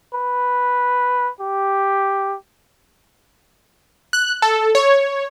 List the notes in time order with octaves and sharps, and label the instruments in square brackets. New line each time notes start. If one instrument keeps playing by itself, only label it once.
[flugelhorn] B4
G4
[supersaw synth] F#6
A4
C#5